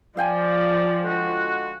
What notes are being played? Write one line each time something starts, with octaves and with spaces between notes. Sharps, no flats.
F3 D5 F5 G5 G#5
D3 G#3 F#4